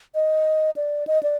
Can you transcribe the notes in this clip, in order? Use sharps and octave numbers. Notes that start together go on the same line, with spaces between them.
D#5
D5
D#5
D5